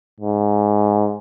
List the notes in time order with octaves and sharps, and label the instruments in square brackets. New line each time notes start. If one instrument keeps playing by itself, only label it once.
[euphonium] G#2